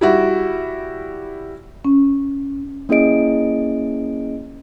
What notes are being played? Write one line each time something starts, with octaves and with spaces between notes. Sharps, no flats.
G3 E4 F#4
C#4
A#3 C#4 E4 G#4 D#5 D7